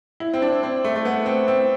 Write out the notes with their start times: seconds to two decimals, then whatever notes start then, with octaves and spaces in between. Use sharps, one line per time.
0.20 E4
0.34 C4
0.42 D4
0.63 C4
0.84 A3
0.96 A3
1.05 B3
1.26 C4
1.48 C4